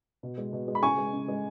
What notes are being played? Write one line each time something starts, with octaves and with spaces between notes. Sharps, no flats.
B2
G#3
B2
G#3
B5
C#3 G#5 C#6
G#3
C#3
G#3